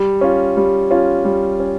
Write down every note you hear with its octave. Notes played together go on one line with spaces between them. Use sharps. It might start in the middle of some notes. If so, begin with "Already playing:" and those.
Already playing: G3
C#4 F4
G3
C#4 F4
G3
C#4